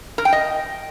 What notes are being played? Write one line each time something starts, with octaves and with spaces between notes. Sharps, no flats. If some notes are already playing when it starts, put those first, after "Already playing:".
A#4
G5
D#5